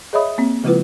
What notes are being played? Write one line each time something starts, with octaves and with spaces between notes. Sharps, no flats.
G#4 C#5 D#5 E5 B5 D#6
A#3 C4
C#3 F3 G#3 E4 F4 B4